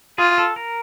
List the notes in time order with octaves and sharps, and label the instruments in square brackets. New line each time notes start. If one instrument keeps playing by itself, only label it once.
[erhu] F4 [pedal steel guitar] G#4
[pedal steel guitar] A4
A#4